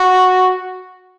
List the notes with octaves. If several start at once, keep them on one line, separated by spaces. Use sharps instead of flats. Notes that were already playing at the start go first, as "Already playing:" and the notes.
Already playing: F#4